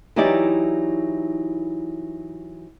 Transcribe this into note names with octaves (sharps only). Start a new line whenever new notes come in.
E3 F#3 D#4 E4 G4 D5